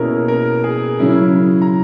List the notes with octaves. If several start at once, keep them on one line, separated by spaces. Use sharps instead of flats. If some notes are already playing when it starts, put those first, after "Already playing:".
Already playing: B2 A#3 C#4 E4 G#4 A#4
A#4
G#4
C#3 F#3 C#4 E4
A#5